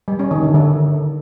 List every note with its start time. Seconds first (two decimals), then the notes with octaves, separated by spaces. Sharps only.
0.08 G3
0.19 C#4
0.31 D#3
0.43 D3
0.54 D3